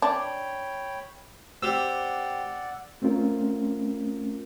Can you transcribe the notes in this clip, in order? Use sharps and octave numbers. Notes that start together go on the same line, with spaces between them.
D4 C#5 G5 B5
C4 G4 D5 F#5 E6
A3 C4 C#4 F4 A#4